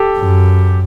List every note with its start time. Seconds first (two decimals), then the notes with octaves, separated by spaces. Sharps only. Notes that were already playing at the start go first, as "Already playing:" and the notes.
Already playing: G4 A4
0.17 F#2